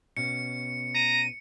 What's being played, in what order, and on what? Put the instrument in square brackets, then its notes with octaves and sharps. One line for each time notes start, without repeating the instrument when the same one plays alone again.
[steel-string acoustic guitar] B2 C#4 [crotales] C#7
[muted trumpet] A#5 [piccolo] D#7